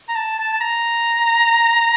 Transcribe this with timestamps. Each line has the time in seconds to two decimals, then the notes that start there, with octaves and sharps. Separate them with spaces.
0.09 A#5
0.15 A5
0.38 A5
0.52 A5
0.61 A#5